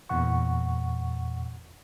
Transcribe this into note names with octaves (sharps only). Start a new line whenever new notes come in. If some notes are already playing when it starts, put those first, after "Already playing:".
E2 A#2 F#5 C#6